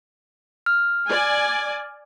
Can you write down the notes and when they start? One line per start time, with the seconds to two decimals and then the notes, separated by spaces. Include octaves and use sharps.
0.66 F6
1.09 D5 G#5